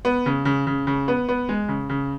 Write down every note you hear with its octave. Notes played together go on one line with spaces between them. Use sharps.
B3
C#3
C#3
C#3
C#3
B3
B3
G#3
C#3
C#3